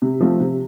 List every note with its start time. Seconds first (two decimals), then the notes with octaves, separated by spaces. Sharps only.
0.02 C3
0.20 F3 A3 C4
0.40 C3